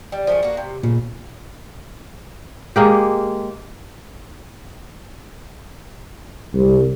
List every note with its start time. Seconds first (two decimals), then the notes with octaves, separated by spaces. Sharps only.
0.12 G3
0.27 F3 A3 G#4
0.43 A#3 F#4
0.57 C3
0.83 A#2 C#3
2.76 G#3 A#3 G4
6.54 C2